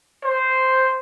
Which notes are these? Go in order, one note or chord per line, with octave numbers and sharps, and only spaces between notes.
C5